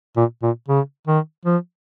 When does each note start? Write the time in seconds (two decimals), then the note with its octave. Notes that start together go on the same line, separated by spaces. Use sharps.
0.17 A#2
0.43 A#2
0.68 C#3
1.07 D#3
1.45 F3